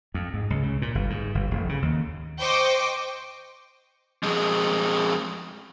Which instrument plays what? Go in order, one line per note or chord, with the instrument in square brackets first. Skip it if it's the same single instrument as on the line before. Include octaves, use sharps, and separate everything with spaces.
[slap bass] F2
G#2
C#2
C#3
A#2
G1
G#2
G1
F1
C#3
D#2
[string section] C5 D#5 G5 C#6 D6
[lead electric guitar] F2 G#3